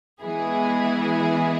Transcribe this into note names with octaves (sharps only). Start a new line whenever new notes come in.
E3 G#3 B3 E4 G#4